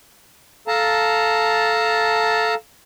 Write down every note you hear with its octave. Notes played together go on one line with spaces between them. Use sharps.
A4 F5 A5 A#5